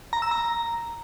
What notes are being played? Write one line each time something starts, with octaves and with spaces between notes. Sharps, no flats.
A#5
E6
A#5